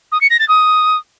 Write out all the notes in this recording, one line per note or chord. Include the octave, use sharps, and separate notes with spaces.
D#6
C#7
A#6
A6
D#6